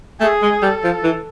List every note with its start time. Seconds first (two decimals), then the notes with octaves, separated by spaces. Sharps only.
0.21 A3 G#4
0.42 G#3
0.62 G3 A4
0.84 F3
1.04 E3